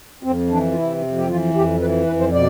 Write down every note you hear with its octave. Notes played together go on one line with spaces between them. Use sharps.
F2 C4
E3 D4
F4
C3 E4
F2
G4
E3 F4
F2 G4
E3 B4
F2 B4
C5
B2 D5